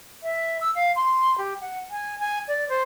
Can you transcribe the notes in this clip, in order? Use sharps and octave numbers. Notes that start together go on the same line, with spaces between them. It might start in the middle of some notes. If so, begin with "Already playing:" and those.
E5
E6
F5
C6
G4
F#5
G#5
G#5
D5
C5